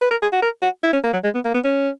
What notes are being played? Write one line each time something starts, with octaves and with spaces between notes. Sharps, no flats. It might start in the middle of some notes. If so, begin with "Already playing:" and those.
B4
A#4
G#4
F#4
A#4
F#4
E4
C#4
A#3
F#3
G#3
B3
A#3
B3
C#4